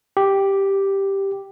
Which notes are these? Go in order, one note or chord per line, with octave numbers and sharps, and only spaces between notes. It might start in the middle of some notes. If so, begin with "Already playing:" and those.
G4